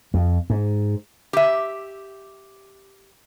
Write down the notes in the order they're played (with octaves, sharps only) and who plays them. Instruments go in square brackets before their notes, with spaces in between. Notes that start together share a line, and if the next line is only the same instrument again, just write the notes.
[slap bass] F2
G#2
[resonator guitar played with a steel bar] G4 E5